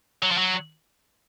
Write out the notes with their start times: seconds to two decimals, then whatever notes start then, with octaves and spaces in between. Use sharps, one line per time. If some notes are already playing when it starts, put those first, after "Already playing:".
0.23 F#3
0.31 F3
0.38 F#3